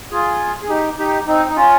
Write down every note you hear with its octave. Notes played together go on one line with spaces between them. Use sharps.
F4 G#4
G#4
D#4 G4
D#4 G4
C4 D#4
D#4
C#4 F4